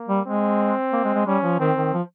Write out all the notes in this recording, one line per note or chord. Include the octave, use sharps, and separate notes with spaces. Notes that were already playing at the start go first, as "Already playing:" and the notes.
Already playing: A#3
G3
G#3 C4
A#3
G#3
G#3
G3 C#4
F3
D#3 C4
D#3
F3